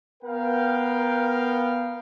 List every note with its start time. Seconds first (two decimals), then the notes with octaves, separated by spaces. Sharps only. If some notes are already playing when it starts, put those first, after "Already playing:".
0.23 B3 A#4 F5 G5